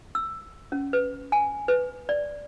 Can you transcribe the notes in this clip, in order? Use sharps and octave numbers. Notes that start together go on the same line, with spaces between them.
E6
C#4
B4
G#5
B4
D5